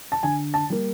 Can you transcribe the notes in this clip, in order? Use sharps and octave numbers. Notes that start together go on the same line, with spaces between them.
A5
D3 G#5
A5
G3 A#3